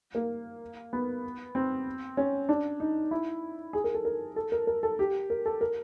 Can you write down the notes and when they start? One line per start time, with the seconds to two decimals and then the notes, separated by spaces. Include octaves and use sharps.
0.15 A#3
0.93 B3
1.55 C4
2.17 C#4
2.49 D4
2.80 D#4
3.11 E4
3.73 G#4
3.84 A#4
3.95 A4
4.05 A#4
4.36 A4
4.52 A#4
4.67 A#4
4.83 A4
4.99 G4
5.30 A#4
5.46 A4
5.61 A#4